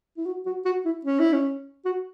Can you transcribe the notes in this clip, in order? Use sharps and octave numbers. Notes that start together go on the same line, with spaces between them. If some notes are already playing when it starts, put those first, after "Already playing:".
E4
F#4
F#4
F#4
E4
C#4
E4
C#4
F#4